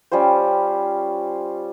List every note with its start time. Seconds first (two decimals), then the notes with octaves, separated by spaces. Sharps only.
0.12 G3 C#4 F4 C5